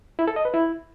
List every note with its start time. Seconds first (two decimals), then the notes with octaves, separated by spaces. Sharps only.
0.19 E4
0.28 A4
0.36 D#5
0.45 B4
0.54 E4